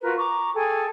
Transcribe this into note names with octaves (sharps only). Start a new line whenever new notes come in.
F4 F#4 A#4 B4
A#5 C#6 D6
G#4 A4 G5 G#5